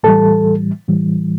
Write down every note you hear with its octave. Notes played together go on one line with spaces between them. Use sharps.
A2 E3 G3 A4 A5
A2 E3 G3